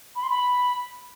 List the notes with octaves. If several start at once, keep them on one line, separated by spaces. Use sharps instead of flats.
B5
C6
B5